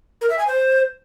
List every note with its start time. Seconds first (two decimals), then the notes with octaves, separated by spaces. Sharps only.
0.21 A#4
0.30 E5
0.39 G#5
0.47 C5